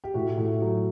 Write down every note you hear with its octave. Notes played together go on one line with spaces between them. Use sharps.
G4
A2 F#4
A2
F#3